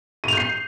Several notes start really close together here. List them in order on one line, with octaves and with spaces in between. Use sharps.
D#7 F7 G6 C7